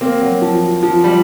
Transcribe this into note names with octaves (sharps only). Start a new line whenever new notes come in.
A#3 C4
F#3
F3
F3
F3 G3